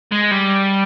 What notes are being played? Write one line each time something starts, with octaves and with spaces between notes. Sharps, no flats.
G#3
G3